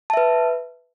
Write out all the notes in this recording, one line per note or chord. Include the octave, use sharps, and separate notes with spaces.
B4 E5 A5